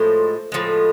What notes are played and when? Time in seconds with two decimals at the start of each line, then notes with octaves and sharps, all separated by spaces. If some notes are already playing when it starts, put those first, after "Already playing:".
Already playing: A2 F3 G#3 C5
0.52 A2 F3 G#3